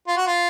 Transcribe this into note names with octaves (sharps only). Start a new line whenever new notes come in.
F4
F#4
F4